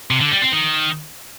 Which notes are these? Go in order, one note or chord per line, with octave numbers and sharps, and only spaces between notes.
C3
D3
G3
C4
D#3